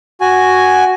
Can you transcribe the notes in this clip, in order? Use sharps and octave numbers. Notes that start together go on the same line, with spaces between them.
F#4 G#5